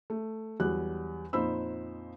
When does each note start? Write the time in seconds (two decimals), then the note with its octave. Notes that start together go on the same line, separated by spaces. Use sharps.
0.10 A3
0.60 E2 F#3 G3 F#6
1.33 F2 A#2 D#4 C5 B5 E6